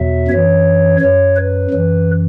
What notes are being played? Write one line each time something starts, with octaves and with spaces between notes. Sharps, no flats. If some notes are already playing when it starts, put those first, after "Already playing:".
Already playing: E2 B2 F#3 E5
F#2 E3 C#5
F#2 F#3 C#5
B4
F#2 E3